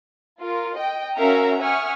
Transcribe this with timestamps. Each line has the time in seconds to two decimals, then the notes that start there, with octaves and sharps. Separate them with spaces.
0.39 F4 A#4
0.74 D#5 G5
1.16 C#4 F#4 A#4 E5 F5 A#5
1.60 E5 F#5 G#5 C#6 D#6 F6